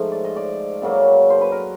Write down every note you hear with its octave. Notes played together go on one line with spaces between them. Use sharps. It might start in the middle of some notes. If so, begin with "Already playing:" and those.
Already playing: G#2 F3 A3
D5
D#5
D5
F#2 C#3 F#3 A#3
C5
B4
A#4